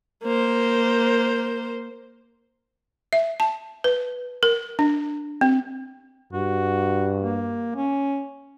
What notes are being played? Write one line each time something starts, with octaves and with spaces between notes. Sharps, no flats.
A#3 C5
E5
A5
B4
A#4
D4
C4
G2 F#4
A#3
C#4